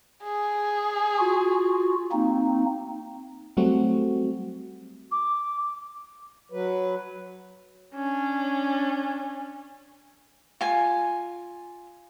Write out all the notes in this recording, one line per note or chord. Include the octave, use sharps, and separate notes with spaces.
G#4
F4 F#4
A#3 C4 D#4
F#3 G3 A3 C4 F#4
D6
F#3 B4
C#4 D4
F4 G#5